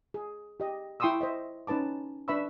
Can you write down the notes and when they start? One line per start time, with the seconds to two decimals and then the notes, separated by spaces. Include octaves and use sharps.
0.14 G#4
0.60 G4 D#5
1.00 E4 G5 C6 C#6 D#6 E6
1.21 C5 D#5 E5
1.67 C#4 D#4 B4 A5 D6
2.28 D4 B4 E5 B5 C#6 E6